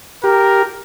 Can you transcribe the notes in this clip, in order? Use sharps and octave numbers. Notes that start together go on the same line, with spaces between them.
G4 A#4